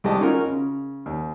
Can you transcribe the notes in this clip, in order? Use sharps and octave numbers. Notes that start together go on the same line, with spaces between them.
C2 G#3 G4 D#5 A5
C#4 D#4 F4 F#4 A#4
C#3
D#2